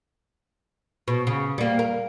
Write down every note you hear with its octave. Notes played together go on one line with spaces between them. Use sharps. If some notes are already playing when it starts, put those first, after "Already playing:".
B2
C#3
G3 A#3
A#4